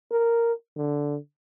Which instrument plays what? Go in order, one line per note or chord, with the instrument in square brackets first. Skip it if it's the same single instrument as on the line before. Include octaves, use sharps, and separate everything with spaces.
[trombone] A#4
D3